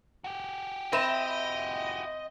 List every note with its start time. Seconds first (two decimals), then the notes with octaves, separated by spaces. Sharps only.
0.24 F#4 G4
0.93 C4 D#5 E5 B5 E7